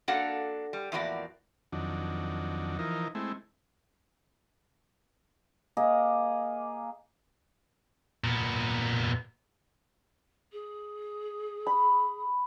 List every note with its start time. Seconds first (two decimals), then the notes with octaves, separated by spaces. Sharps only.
0.08 A#3 D4 F#4 A4 F5 F#5
0.73 G3
0.92 E2 A2 F3 A#3 F#4 D5
1.72 F2 D#3 F#3 D4
2.79 E3 F3 D#4 A#4
3.15 G#3 A3 C4 E4
5.77 A#3 G#4 D#5
8.24 A#2 B3
10.52 G#4
11.66 B5